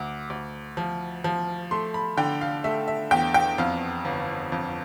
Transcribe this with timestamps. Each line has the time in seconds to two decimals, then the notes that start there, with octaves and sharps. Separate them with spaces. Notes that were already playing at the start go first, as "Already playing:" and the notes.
Already playing: D2 D6
0.30 D2
0.77 F3
1.24 F3
1.71 A3 C6
1.94 B5
2.17 D3 G5
2.41 F5
2.64 A3 E5
2.88 E5
3.11 E2 G5
3.34 G5
3.58 F2 F5
4.05 G1
4.52 F2